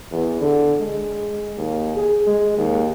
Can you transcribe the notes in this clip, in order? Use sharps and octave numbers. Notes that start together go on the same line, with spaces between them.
E2
D3
G#3
D#2
G#4
G#3
D#2